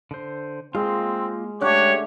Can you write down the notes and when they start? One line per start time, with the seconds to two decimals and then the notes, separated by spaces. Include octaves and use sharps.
0.11 D3 C5
0.75 G#3 A#3 C4 F4
1.61 D3 G#3 A3 G4 C#5 D6 F#6